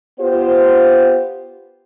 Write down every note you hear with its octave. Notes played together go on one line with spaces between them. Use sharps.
B3 F4 G4 C5